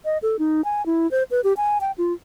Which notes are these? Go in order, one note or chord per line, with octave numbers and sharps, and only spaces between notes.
D#5
A4
D#4
G#5
E4
C5
B4
G4
G#5
G5
F4